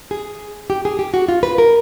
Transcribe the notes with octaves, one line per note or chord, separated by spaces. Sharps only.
G#4
G4
G#4
G4
F#4
F4
B4
A#4